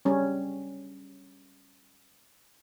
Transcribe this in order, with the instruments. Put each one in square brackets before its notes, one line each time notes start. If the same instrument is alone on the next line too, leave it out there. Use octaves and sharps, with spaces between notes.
[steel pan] G3 C#4